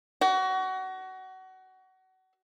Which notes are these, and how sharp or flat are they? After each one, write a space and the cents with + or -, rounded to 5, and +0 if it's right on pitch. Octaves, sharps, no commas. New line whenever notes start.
F#4 +25